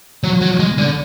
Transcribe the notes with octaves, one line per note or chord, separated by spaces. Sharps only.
F#3
F#3
G#3
D3